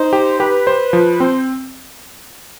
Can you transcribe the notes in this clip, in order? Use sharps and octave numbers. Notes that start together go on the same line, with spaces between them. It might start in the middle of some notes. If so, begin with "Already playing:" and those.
Already playing: D#4 C5
G4
G4 B4
C5
F3
C4 C5